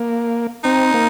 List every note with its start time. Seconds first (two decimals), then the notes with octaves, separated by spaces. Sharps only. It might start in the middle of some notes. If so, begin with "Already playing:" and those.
Already playing: A#3
0.64 C4 D#4
0.94 A#3